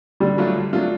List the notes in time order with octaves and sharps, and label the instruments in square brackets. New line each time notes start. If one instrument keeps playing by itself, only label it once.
[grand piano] D3 [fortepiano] G3
[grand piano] F#3 A3 D4 F4
D3
F#3 A3 D4 F4